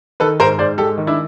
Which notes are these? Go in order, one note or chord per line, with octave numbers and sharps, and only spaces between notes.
D#3 A4 B4
G#2 A#4 C5
G#2 C5 D5
G#3 G4 A4
D#3
D4 E4